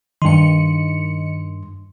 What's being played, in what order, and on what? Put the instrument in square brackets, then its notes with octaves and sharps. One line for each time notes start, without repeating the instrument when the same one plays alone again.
[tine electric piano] G2 C6 [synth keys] D#3 C#7